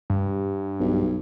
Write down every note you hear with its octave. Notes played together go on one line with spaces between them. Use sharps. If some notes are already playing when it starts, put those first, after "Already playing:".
G2
B1